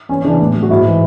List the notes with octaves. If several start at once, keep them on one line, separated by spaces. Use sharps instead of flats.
E2 C#4
C#3 E3 D4
A2
F#3
F#4
G#2 E4
E3